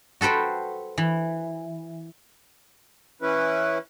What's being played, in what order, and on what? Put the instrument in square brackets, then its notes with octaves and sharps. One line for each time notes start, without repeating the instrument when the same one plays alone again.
[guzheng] F#4 A4 B4 C5 G5
E3
[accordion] E3 C#4 E4 B4